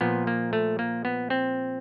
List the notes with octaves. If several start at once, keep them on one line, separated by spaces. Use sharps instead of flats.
A#2 F3 B3
A#3
A3
A#3
B3
C4